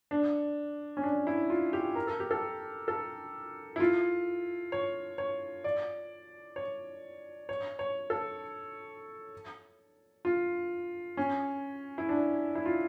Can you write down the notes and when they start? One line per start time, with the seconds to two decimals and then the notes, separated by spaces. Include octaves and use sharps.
0.11 D4
0.97 C#4
1.03 D4
1.27 E4
1.50 F4
1.73 G4
1.95 A#4
2.07 A4
2.20 G4
2.31 A4
2.88 A4
3.76 E4
3.80 F4
4.72 C#5
5.18 C#5
5.64 D5
6.56 C#5
7.49 C#5
7.79 C#5
8.10 A4
10.25 F4
11.17 C#4
11.98 E4
12.09 D4
12.55 E4
12.66 F4